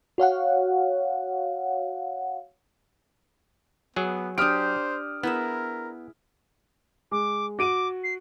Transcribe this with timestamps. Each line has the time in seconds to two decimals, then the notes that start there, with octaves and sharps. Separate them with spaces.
0.18 F#4 C#5 F5 F#5
3.96 F#3 B3 G#4
4.38 D4 G4 C5 D#6 F6 D7
5.23 B3 E4 G#4 A#4 E5
7.12 G#3 D6
7.59 F#4 D6 D7 D#7
8.04 C7